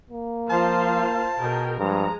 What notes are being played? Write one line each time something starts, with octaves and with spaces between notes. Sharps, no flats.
A#3
F3 F4 C5 F5 A5
B2 G#4 A#4 G5
G2 F3 G#3 A#5